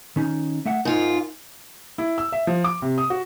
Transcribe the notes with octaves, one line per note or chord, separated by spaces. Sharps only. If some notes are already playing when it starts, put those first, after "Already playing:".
D#3 C#4 D#4
A3 E5 F#5
G#2 D#4 F4 A#4
E4
E6
E5
F3
D6
C3
D#6
F#4